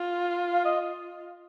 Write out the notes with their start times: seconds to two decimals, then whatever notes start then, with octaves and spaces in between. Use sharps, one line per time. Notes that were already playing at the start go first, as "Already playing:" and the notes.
Already playing: F4
0.52 F5
0.65 D#5